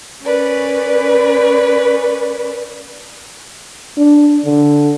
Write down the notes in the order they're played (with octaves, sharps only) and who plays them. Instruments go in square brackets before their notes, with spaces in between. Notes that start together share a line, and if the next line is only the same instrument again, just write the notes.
[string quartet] C#4 A#4 B4 D5
[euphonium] D4
D3